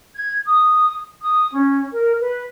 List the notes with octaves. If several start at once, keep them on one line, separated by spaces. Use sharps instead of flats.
G#6
D#6
D#6
C#4
A#4
B4